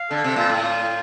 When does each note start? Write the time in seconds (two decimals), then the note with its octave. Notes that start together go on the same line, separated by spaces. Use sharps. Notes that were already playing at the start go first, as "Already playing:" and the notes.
Already playing: F5
0.10 D3 A4
0.24 C3
0.36 A#2 F4
0.49 A2
0.63 F4